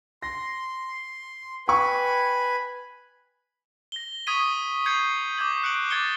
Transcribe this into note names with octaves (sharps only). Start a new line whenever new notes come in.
C6 A#6
B4 G5 G#5 B5 C#6
A#6 G7
C#6 D#6 G#6 B6 D#7
G6 G#6 C7 C#7
D6 G6 G#6 F#7
F#6 C#7 D7 F#7
D6 G#6 A6 C#7 G7